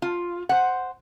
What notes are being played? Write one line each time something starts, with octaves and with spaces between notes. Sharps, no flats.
F4
C5 F#5